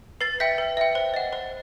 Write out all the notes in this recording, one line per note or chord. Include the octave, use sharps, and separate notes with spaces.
B4 A6 C7
E5 G5 G6 B6
B4
E5 G5
C5
D#5 F#5
C5